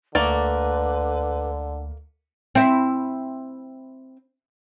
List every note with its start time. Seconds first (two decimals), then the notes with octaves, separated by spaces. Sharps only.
0.15 D2 D3 A3 A#3 B4 D5
2.55 C4 E4